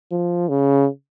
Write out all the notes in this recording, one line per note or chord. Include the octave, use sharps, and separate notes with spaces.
F3
C#3